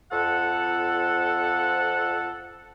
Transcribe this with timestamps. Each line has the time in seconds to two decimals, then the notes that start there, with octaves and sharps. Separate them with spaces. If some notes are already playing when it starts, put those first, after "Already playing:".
0.12 F2 F3 A4 F#5